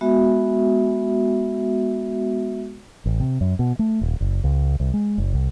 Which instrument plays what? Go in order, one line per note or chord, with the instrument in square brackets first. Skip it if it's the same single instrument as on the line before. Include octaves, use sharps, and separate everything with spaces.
[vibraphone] G#3 B3 F#4 E5
[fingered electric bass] A1
C3
F#2
B2
A3
D#1
F#1
C#2
C2
G#3
F#1
C2